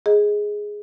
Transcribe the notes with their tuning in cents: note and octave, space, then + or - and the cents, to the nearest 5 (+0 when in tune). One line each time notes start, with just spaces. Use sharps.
G#4 +0 D#5 +20